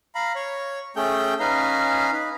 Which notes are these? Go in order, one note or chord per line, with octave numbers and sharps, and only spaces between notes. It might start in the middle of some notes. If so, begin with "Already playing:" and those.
F5 A#5 B5
C#5
A3 C#4 G#4 A4 G5 G6
C#4 D#4 B4 F5 G#5 A#5
D#4 B4